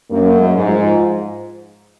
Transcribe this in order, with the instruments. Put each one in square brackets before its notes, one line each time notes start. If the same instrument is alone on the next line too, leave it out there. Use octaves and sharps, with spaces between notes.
[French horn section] F#2 [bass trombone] A#3
[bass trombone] G#3
[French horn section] G#2
[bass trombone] F3